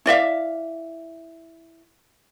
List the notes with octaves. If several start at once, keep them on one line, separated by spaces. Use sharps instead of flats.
E4 D5 E5 F5